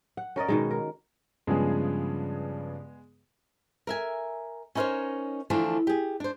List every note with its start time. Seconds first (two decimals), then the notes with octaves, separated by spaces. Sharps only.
0.17 F#5
0.36 C#4 A#4 D5 D#5
0.48 B2 D#3 G#3
0.71 A#4
1.47 G2 C#3 F3 G#3 B3 G#4
3.87 A#4 E5 G#5
4.75 C#4 D#4 E4 A#4 C5 C#5
5.50 D3 E3 F3 A3 D4
5.87 G4 G#4
6.20 D4 C5